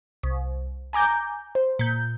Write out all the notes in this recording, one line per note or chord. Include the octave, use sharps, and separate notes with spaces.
C2
G#5 A#5 D6 G6
C5
A#2 G6